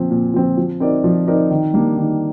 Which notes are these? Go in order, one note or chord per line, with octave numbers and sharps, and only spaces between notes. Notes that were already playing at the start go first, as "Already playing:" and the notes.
Already playing: A#2 F3 C4
A#2
F3 C4
F3
C4 D#4 A#4 D5
F3
C4 D#4 A#4 D5
D#3
G3 A#3 D4
D#3